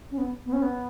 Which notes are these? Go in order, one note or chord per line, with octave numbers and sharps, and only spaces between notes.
C#4
B3
B3
C#4
B3